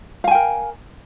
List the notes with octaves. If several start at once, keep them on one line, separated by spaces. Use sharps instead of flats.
A#4 F5 G5 G#5